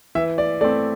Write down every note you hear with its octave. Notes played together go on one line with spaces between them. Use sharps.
E3 E5
D5
A3 C4 D5